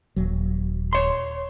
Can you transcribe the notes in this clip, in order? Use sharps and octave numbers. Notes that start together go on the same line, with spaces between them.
D#1 F#3
C#5 C6